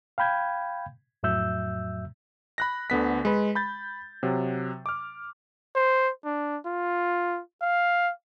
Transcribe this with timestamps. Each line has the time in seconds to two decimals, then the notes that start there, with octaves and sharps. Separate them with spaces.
0.18 F5 G5 B5 G6 G#6
1.23 F2 A2 F#3 E5 E6 G6
2.58 B5 F#6 A#6
2.90 D2 D3 B3 B6
3.25 G#3 B4
3.55 B5 G6 A6
4.23 C3 F#3
4.86 D6 F6
5.75 C5
6.25 D4
6.66 F4
7.62 F5